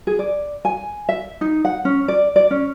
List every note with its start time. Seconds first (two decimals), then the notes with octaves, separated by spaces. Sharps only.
0.07 G#4
0.19 D5
0.65 G#5
1.09 E5
1.41 D#4
1.65 F#5
1.85 C#4
2.08 D5
2.36 D5
2.51 C#4